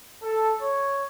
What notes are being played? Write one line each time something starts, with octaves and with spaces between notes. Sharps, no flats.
A4
C#5